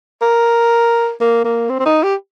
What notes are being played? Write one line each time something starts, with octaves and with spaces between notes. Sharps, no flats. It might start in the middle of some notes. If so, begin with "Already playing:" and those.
A#4
A#3
A#3
C4
C4
D#4
G4